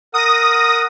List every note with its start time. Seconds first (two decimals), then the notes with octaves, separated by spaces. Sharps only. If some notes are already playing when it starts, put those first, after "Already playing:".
0.14 A#4 F#5 D#6 A#6